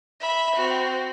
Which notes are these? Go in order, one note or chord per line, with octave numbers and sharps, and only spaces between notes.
E5 B5
C4 F#4